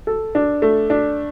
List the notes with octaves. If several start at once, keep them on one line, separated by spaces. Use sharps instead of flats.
A4
D4
A3
D4